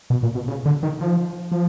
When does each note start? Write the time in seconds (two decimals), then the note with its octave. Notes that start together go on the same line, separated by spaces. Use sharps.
0.10 B2
0.23 A#2
0.35 B2
0.48 C#3
0.66 D3
0.83 D#3
1.01 F3
1.52 F3